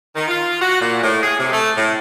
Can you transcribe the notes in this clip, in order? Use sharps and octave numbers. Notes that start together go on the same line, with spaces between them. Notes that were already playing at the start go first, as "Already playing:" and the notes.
D#3
F4
F#4
A#2
A2
G#4
C3
A3
A2